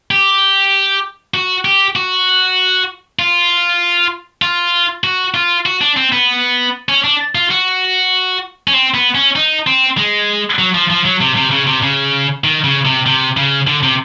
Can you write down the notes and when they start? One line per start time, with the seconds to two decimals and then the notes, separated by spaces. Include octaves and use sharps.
0.11 G4
1.34 F#4
1.65 G4
1.96 F#4
3.19 F4
4.42 F4
5.04 F#4
5.34 F4
5.66 F#4
5.81 D4
5.97 C4
6.12 B3
6.89 C#4
7.04 D4
7.35 F4
7.51 F#4
8.68 C#4
8.74 C4
8.94 B3
9.15 C#4
9.36 D#4
9.67 C4
9.97 G#3
10.59 F#3
10.74 F3
10.90 F3
11.05 F#3
11.21 C3
11.36 C3
11.51 C#3
11.67 C3
11.82 C#3
12.44 D#3
12.64 C#3
12.85 C3
13.06 C3
13.37 C#3
13.67 D3
13.83 C3